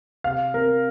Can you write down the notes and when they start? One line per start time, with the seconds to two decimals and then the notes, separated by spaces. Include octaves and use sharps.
0.24 C3 F5
0.54 C4 A#4